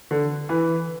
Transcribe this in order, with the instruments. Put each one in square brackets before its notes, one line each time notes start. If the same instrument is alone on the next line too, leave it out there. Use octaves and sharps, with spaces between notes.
[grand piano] D3
E3